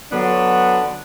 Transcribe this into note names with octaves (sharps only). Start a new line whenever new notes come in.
D3 F#3 B3 D4